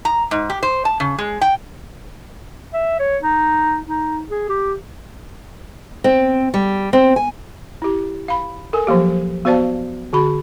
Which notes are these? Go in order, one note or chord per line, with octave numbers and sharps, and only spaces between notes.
A#5
G#2
G4
C5
A5
C#3
G#3
G5
E5
C#5
D#4
D#4
G#4
G4
C4
G3
C4
G#5
E4 G4
F5 B5
A4 A#4 G#5
F3 F#3 A#3 G4
B3 F#4 C5 D5 F5 A5
D3 F#4 B5